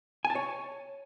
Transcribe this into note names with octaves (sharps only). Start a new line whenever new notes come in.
G#5
A5
C#5